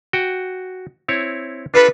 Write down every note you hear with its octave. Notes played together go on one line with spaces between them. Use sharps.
F#4 G5
C4 E4 C#5
D4 F4 A4 B4